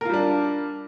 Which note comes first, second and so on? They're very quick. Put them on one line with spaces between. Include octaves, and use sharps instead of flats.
A#4 F4 G3 D4